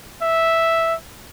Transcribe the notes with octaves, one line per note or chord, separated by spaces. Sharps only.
E5